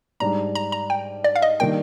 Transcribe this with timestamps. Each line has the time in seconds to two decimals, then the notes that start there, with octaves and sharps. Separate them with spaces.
0.20 G#2 G3 D4 A#5
0.55 A#5
0.72 A#5
0.90 G5
1.24 D5
1.36 F5
1.42 D#5
1.60 D#3 G3 A#3 D4 G5